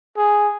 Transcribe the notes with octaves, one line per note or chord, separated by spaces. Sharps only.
G#4